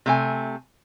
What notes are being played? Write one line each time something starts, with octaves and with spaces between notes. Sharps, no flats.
C3 A3 G#5